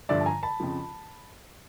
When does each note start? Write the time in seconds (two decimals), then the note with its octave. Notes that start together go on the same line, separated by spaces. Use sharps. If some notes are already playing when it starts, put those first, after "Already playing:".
0.09 G2 D3 F3 D5 E5
0.21 A5
0.26 G#5 A#5
0.43 A5 B5
0.60 F2 C#3 F3